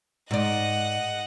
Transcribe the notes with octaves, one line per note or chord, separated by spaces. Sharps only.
G#2 D5 D#5 F#5